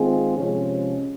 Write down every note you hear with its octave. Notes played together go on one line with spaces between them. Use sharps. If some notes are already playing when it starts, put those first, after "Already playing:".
Already playing: D#3 G#3 C4 F4 G#4
C3 F3 G#3 C#4